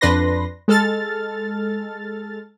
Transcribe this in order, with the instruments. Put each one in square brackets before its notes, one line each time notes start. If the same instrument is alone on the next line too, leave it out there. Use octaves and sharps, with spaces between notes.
[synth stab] F2 D4 B4 C6 A#6
G#3 A4 F6 A6